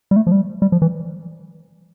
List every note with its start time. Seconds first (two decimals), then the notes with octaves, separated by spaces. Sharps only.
0.11 G3
0.16 A3
0.27 F3
0.32 G3
0.62 G3
0.72 F3
0.82 E3